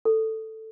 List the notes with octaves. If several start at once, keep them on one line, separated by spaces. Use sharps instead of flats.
A4